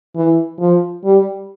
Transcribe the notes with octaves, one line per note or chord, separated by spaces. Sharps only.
E3
F3
G3